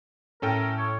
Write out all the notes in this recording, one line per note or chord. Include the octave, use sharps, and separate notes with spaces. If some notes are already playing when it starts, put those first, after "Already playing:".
A2 C#4 A4 A#4 G5 D#7
C#5